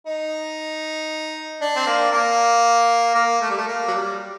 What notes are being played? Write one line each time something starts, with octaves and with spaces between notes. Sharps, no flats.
D#4
D4
C4
A#3
A#3
A#3
A3
G3
A3
A#3
F#3
G3